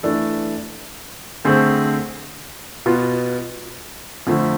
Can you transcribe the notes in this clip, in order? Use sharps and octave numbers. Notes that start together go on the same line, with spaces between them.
E3 A3 D4 A4
D3 A3 C4 G#4 C5
B2 B3 F4
F2 D3 F3 A3